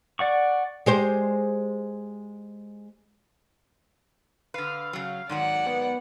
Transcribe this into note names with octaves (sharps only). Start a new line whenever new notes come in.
D5 F#5 C#6
G#3 G4 C5
D3 B4 F5
C#3 F#3
G#2 D#3 F#3 D5 F#5
B3